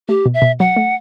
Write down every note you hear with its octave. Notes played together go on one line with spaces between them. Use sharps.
A3 G4
B2
E5
B2
F#3 F#5
A3